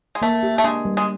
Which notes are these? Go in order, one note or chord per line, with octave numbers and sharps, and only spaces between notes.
G#3
A3 A#3
G4
A3
G#3 D4
G3
G#3